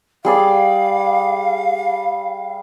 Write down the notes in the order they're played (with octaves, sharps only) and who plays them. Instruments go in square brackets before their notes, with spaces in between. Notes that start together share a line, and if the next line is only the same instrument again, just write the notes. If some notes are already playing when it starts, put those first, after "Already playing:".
[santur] G3 G#4 D5 [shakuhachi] F5